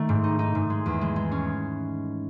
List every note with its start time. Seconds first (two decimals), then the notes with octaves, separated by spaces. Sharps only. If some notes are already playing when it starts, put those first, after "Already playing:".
Already playing: D#3 A3
0.09 G#2
0.24 D#4
0.39 D#4
0.55 G#2
0.70 G#3
0.86 E2
1.01 G#3
1.16 G#3
1.32 C#4